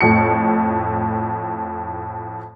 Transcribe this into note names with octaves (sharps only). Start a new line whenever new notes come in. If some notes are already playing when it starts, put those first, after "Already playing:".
F2 A2 C#7